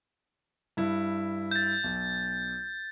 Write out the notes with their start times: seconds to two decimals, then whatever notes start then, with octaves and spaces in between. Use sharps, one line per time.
0.77 G2 E4
1.51 G6 A6
1.84 B1